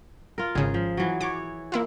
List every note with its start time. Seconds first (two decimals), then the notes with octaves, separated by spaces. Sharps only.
0.38 F4 A#4
0.55 G#1 C#3 G#4
0.74 F3
0.97 E3 F#3
1.21 E3 C#5 D6
1.72 A#3 E4 F4